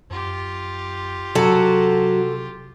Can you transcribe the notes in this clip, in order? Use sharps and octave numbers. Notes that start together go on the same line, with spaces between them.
F#2 F4 G4
C3 F#3 F#4 A4